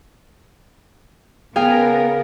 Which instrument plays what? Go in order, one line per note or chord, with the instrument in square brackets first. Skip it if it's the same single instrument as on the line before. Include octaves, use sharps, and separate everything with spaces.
[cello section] C#3 B3 A#4 [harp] G#4 F5 [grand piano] G5